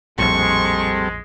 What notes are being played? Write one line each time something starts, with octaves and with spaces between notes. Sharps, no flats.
A#1 F2 A2 G3 G#3 C4 A4 C#6